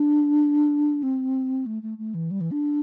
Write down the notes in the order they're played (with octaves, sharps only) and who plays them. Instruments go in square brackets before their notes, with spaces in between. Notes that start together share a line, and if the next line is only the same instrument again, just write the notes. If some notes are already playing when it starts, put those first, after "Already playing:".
Already playing: [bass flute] D4
C4
A3
A3
A3
E3
G3
E3
D4